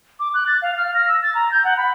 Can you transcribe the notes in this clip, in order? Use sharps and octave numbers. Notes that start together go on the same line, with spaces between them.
D6
F#6
A6
F5
F6
A#6
E6
A6
A#5
G6
F#5
B5